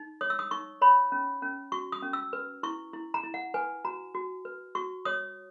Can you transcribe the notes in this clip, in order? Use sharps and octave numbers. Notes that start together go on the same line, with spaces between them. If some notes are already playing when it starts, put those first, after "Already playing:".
Already playing: D#4
C#5 D#6
E6
D#6
D#4 C#6
C#5 B5
C#4
C#4
F#4 C#6
D#6
C#4
E6
B4
E4 C#6
E4
A#5
E4
F#5
B4 G#5
F#4 A#5
F#4
B4
F#4 C#6
C#5 D#6